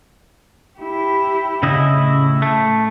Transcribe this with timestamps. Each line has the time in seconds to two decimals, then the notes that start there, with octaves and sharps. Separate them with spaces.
0.78 E4 G4
1.63 C#3 E4 D#5
1.97 A2
2.42 A3